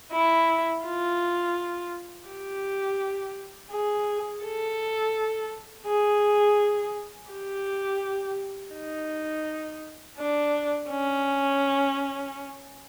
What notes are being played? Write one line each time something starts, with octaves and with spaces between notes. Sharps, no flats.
E4
F4
G4
G#4
A4
G#4
G4
D#4
D4
C#4